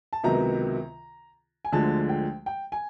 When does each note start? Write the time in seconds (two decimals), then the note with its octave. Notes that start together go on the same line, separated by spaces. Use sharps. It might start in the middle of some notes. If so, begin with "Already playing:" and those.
0.13 A5
0.24 C#2 C3 D#3 F#3 B3 A#5
1.65 G#5
1.72 D2 D3 F3 G#3 A5
2.09 G5
2.46 G5
2.72 G#5